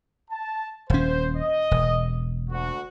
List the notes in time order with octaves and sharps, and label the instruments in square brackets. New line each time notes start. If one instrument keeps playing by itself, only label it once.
[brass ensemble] A5
[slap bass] D#1 C#4 [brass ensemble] C5
[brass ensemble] D#5
[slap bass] E1
[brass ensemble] D2 F#4